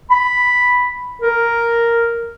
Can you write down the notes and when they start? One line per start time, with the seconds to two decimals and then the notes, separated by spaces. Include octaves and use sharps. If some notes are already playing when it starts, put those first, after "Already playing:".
0.10 B5
1.22 A#4